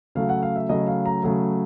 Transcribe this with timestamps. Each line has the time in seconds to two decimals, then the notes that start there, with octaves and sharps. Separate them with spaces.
0.15 C#3 F#3 A3 F5
0.29 F#5
0.43 F5
0.56 E5
0.69 C#3 F#3 A3 D#5
0.87 F5
1.06 A#5
1.23 C#3 F#3 A3